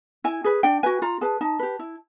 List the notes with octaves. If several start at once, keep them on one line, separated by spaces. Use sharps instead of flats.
E4 G#5
G#4 B4
D4 G5
F#4 B4 G#5
F4 A#5
G#4 B4 A5
D#4 A5
G4 B4
E4